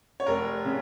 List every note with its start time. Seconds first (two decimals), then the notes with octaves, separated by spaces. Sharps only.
0.20 C#5
0.26 F1 A#4
0.65 C#3